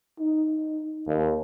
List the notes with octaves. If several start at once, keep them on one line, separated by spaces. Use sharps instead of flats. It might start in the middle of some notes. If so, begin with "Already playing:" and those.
D#4
D#2